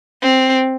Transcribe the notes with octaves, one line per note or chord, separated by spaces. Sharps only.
C4